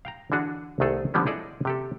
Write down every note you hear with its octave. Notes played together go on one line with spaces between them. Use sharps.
F5 G5 A#5
D3 E3 D4 F#4 G#4
C2 D#3 A3 G#4 A4
D3 F3 G3 B3 C#4
E4 G#4 A4 D5 D#5
C3 G4 A4